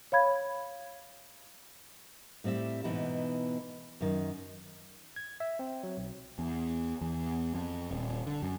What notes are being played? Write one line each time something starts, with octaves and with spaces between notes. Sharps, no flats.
C#5 F5 B5 G#6
A2 G3 C4 D5 E5
G#2 B2 E3 B3 D#4 E4
F#2 D#3
G#6
E5
C4
F#3
B1
E2
E2
F2
D#1
D3
F#2